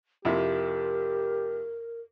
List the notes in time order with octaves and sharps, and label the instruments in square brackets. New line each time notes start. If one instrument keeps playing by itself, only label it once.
[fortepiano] F2 C3 E4 [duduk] G4 [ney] A#4